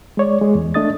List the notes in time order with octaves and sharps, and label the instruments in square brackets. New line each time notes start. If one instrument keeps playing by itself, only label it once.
[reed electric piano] G#3 C#5 D5
G#3 G#4
E2
A3 D4 D#5 D#6 A6